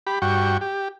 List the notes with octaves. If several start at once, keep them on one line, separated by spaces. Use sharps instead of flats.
G4 B5
G2 F#4 G5 C#6
G4